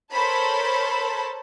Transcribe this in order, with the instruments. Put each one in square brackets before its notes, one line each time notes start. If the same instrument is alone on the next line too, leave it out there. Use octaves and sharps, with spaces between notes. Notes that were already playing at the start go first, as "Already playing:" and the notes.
[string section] A4 A#4 C5 C#5 A5 B5